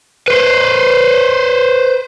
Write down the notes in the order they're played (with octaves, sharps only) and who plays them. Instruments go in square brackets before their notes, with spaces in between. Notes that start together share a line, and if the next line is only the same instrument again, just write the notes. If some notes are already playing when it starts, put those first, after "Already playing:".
[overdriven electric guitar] B4 C5